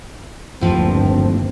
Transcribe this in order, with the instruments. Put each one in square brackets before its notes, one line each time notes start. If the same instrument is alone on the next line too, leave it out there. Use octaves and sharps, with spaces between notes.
[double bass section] G1 D#2 C4 [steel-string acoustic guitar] A2 F3